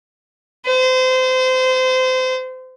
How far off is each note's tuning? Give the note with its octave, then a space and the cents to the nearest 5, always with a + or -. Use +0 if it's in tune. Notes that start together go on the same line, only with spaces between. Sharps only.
C5 -25